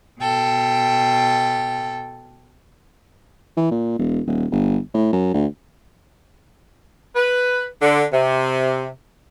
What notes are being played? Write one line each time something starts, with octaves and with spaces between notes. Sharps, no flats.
B2 A4 G5
E3
A#2
E1
D#1
G1
A2
F#2
D2
B4
D3
C3